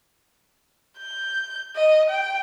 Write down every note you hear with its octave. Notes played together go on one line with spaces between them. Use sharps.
G6
D#5
G5